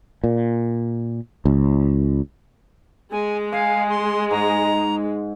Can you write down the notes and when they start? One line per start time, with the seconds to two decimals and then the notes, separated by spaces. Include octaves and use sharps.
0.24 A#2
1.45 C#2
3.12 G#3 G#5
3.52 F5 G#5
3.90 C6
4.31 G#2 A#5